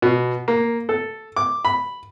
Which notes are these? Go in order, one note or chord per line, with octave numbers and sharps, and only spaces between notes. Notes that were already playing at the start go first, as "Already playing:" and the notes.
B2
A#3
A4
D6
B5